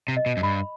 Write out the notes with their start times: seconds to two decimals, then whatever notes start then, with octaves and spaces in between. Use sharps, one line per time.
0.08 C3
0.17 D#5
0.26 B2
0.37 F#2
0.43 G2 B5